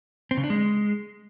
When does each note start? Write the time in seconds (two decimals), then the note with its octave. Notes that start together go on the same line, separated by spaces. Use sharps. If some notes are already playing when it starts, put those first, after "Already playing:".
0.31 C4
0.37 C#3
0.44 D4
0.50 G#3